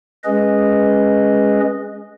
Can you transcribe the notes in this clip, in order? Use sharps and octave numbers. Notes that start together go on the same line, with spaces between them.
G#3 C#4 G#4 B4 D#5